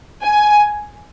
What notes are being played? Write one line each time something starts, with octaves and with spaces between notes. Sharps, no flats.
G#5